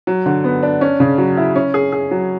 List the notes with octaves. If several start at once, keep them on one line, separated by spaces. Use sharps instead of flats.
F#3
D3
B3
D4
C#4
C#3
F#3
E4
C#4
G#4
G#4
F#3